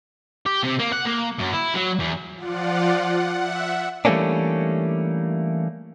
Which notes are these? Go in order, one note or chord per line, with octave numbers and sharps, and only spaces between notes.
G4
C3
A#3
F#5
A#3
F#2
E4
F#3
E2
F3 F4 D5 F#5
F#5
E5 F#5
E3 G3 A3 A#3 C#4 D4